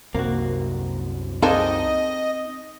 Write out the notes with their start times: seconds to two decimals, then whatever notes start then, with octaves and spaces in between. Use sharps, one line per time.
0.15 C2 F#2 C3 A#3 F#4
1.42 G#3 A#3 C4 D4 D#4 A4 D#5